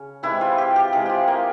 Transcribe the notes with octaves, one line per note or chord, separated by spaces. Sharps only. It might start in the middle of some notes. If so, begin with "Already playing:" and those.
Already playing: C#3 C#4
C3 E3 G#3 E4
F4
G4
G4
C3 E3 G#3 G#4
F4 G4
A#3